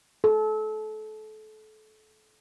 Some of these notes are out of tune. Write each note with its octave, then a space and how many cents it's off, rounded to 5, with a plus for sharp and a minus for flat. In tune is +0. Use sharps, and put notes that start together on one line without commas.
A4 -30